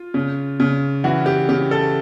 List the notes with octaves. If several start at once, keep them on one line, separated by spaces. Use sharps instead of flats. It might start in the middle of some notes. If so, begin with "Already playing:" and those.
Already playing: F4
C#3
C#3
E3 F#4
G4
C#3 G4
A4